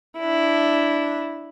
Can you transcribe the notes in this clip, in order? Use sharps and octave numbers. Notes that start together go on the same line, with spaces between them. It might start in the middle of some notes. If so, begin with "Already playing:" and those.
D4 E4